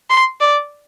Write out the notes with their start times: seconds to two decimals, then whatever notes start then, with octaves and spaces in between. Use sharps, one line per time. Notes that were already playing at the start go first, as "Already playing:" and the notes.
0.10 C6
0.41 D5